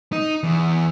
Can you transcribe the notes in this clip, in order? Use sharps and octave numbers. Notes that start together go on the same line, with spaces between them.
D#4
E2